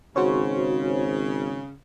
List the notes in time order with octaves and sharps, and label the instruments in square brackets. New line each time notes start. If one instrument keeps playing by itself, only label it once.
[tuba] G#1 [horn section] C#3 [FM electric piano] F#4 C5 C#5